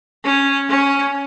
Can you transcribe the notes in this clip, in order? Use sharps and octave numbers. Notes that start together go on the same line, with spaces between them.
C#4
C#4